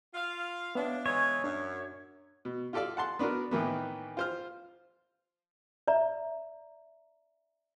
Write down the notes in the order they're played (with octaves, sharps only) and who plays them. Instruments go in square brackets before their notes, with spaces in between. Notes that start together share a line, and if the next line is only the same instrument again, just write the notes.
[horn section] F4 F5
[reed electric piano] B3 E5 F5 [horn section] D4 [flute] C#5
[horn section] E3 G#3 [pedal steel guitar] C#5 [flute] G#6
[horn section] F#2 [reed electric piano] D4 [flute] E5
[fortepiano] B2
F4 G4 A4 D5 F5
F#5 A5 C6
B3 D4 F#4 A#4
A2 D#3 E3 A#3 B3
F4 C5 F6
[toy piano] D5 E5 A#5